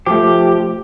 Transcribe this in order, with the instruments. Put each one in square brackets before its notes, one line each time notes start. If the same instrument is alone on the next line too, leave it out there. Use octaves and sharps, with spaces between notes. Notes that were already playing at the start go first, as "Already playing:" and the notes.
[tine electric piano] F3 A3 [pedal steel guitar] G4